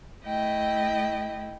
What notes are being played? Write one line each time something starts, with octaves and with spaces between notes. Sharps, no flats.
A3 E4 D#5 G5